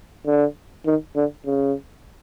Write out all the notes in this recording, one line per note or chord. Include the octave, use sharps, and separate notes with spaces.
D3
D#3
D3
C#3